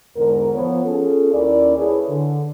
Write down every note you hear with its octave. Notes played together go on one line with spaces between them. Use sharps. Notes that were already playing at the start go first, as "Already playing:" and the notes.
E2 G#2 D3 A#4
F3 B3 C#5
C#4 F4 G#4 A4
D#2 C#4 E4 A#4 D5
E4 G#4 A4 B4 C#5
D3